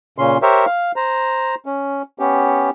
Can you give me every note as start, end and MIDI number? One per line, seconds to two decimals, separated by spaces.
0.18 0.38 46
0.18 0.38 49
0.18 0.38 61
0.18 0.38 84
0.42 0.66 67
0.42 0.66 70
0.42 0.66 72
0.42 0.66 73
0.42 0.66 76
0.66 0.92 77
0.96 1.55 72
0.96 1.55 82
1.66 2.02 61
2.19 2.70 59
2.19 2.70 61
2.19 2.70 67